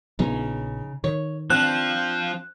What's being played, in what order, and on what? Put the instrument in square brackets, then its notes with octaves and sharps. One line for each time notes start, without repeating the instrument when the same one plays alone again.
[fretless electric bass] A#1 F3 B3 [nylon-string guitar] C#3 D#4
[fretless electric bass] D#3 [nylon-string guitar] C#5
[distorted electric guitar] F3 [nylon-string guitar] C4 D4 [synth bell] F#6